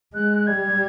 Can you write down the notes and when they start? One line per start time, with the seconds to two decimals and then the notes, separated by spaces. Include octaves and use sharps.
0.14 G#3 F#6
0.47 G3 G#6